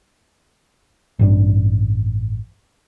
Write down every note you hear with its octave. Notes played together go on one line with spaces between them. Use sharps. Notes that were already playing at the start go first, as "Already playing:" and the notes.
A1 G2 D4